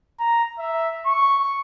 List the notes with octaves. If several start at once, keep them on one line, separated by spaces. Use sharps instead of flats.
A#5
E5
C#6